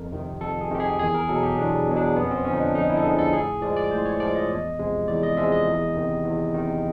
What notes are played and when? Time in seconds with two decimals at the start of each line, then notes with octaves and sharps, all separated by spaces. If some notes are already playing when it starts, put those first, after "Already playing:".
Already playing: F2 A#4
0.12 C3 D#3
0.41 F2 A4
0.61 G#4
0.70 C3 D#3 G4
0.80 G#4
0.99 E2 G#4
1.14 A#4
1.29 B2 F#3 A4
1.43 G4
1.58 E2 D4
1.87 B2 F#3
1.97 D4
2.16 F2 B3
2.24 C#4
2.31 C4
2.45 D3 F3 C#4
2.53 D#4
2.60 D4
2.74 F2 D#4
2.90 E4
2.97 A4
3.03 D3 F3 G#4
3.18 A4
3.33 A2 G#4
3.62 F3 G#3 D5
3.76 D5
3.91 A2 C5
4.05 C#5
4.20 F3 G#3 D5
4.35 D#5
4.49 E2
4.79 C3 F3 G#3
5.08 E2 D5
5.23 D#5
5.37 C3 F3 G#3 E5
5.52 D#5
5.67 E2
5.95 C3 D#3
6.24 E2
6.54 C3 D#3